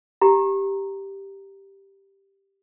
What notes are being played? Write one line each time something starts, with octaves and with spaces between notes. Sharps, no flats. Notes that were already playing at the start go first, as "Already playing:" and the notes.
G4 A#5